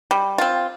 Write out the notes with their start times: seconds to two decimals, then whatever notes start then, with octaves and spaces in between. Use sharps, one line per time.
0.11 G3
0.38 C4 F4